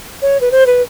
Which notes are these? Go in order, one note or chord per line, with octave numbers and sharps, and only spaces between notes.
C#5
B4
C5
B4